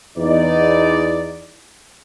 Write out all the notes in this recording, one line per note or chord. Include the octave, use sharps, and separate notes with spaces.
E2 D#4 D5